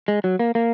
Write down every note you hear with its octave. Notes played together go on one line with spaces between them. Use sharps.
G#3
F#3
A#3
A#3